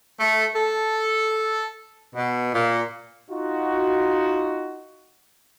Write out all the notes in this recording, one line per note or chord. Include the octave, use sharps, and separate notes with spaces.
A3
A4
B2
A#2
D#4 F4 F#4